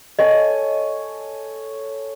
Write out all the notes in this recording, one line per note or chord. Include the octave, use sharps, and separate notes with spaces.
A4 C#5 D#5 G#5